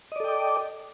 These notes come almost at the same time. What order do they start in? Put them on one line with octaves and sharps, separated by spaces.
D#5 D5 A4 G5 D6